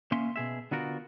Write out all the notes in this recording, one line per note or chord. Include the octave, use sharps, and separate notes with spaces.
A#3 C#4 E5 C6
B2 G#4 E5
D3 B3 F4 F#4 A#4